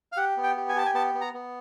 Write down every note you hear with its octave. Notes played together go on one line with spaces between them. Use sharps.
F5
G4 F#5
B3
G5
G4
G#5
G4 A5
G#5
B3 A5
B3
A#5
B3